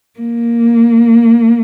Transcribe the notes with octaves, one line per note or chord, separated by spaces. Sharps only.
A#3